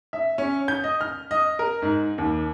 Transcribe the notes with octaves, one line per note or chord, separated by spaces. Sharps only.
E5
C#4
G6
D#5
F6
D#5
A#4
G#2
D#2